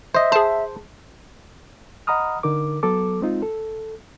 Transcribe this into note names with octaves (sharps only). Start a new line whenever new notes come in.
C5 D#5 E5
G#4 C5 A5
D#5 F#5 A#5 B5 D#6 F6
D3 D#4 A#4 D6
F#3 B3 A4 D6
G#3 C4 D#4 F4
A4